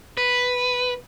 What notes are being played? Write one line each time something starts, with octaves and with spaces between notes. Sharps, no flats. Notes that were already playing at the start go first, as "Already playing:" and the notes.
B4